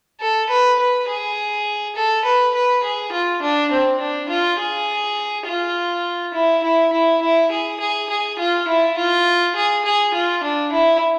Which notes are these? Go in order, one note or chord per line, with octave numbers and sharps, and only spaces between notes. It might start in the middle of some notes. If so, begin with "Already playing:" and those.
A4
B4
B4
G#4
A4
B4
B4
G#4
F4
D4
C4
D4
F4
G#4
F4
E4
E4
E4
E4
G#4
G#4
G#4
F4
E4
F4
G#4
G#4
F4
D4
E4